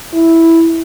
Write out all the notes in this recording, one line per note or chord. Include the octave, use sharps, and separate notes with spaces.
E4